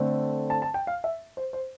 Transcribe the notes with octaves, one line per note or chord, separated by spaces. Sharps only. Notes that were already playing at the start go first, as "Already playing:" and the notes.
Already playing: D3 A3 C4
A5
A5
G5
F5
E5
C5
C5